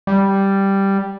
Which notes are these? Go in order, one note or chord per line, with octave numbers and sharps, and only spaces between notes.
G3